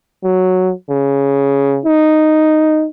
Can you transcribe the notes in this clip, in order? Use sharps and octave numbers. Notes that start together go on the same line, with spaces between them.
F#3
C#3
D#4